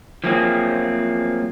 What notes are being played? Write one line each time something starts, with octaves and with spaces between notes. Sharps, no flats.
F3 F#3 A3 A#3 C4 G#4